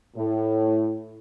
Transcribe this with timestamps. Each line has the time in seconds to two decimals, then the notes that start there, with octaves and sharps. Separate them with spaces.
0.17 A2